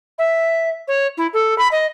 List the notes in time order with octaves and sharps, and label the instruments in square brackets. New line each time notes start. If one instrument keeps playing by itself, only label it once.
[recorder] E5
C#5
E4
A4
B5
D#5